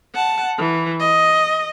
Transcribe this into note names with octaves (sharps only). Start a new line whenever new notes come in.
F#5 A5
E3
D#5